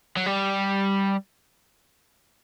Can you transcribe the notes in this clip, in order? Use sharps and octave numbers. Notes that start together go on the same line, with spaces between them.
F#3
G3